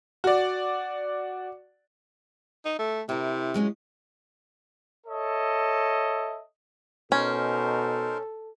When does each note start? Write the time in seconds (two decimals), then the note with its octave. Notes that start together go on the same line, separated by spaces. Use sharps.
0.24 F#4 D5
2.65 D#4
2.79 A3
3.09 C3 E4 A#4
3.54 F#3 G#3 C#4
5.07 A4 C#5 D#5 E5
7.12 B2 C#4 D#4 A4 A#4 C5